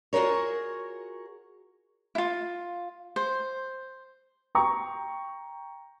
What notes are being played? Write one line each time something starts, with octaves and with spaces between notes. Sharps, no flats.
F4 F#4 G#4 A#4 C#5
E4 F4
C5
G5 A#5 C#6